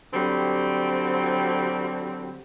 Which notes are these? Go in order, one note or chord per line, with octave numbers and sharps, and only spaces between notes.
D3 F#3 G3 C4